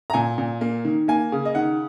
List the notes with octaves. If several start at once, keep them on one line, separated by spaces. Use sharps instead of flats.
A#5
A#2 G#5
A#2
A#3
D#3
A#3 G#5
C#3
D#5
D#3 F#5